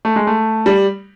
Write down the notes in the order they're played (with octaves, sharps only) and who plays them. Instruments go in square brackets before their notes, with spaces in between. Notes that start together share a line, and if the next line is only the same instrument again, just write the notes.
[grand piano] A3
G#3
A3
G3